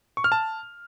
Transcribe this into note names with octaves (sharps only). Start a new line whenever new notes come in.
C#6
F6
A5